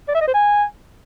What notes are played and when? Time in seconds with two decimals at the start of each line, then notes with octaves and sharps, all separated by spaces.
0.08 D5
0.15 E5
0.21 D#5
0.27 C5
0.34 G#5